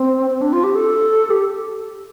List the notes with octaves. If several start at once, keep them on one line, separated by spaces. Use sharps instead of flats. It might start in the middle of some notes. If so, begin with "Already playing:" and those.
Already playing: C4
C4
D4
F4
G4
A4
G4